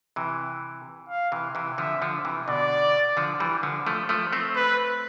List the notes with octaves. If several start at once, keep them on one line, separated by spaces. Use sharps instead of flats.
C3 E3
F5
C3 E3
C3 E3
D3 F3 E5
D3 F3
C3 E3
B2 D3 D5
D3 F3
E3 G3
D3 F3
F3 A3
F3 A3
A3 C4
B4